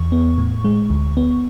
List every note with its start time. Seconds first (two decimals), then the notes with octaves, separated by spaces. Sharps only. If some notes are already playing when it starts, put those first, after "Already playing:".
Already playing: E2 C#6
0.12 B3
0.38 A2
0.64 G#3
0.90 D2
1.17 B3